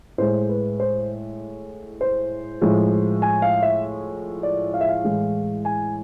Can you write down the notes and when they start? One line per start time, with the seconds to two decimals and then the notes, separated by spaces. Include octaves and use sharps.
0.18 A2 G#3 C5
0.49 B4
0.80 C5
2.01 C5
2.62 A2 F3 G#3
3.22 G#5
3.42 F5
3.63 E5
4.43 D5
4.74 F5
4.81 E5
4.89 F5
5.04 A2 E3 G#3
5.65 G#5